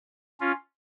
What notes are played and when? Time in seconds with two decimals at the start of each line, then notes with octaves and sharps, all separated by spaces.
0.41 C#4 F4